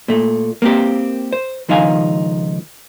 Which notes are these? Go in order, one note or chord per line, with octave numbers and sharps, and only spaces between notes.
A#2 A3
A#3 C4 G4
C5
C#2 D#3 F3 D#4 F5 G#5